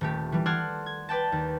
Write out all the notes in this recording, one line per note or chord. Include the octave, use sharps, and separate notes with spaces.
D#1 A3 G4
E3 G3
A4 D5 F#5 C6 F6 G#6
G#6
B4 D5 G5 A5
D#2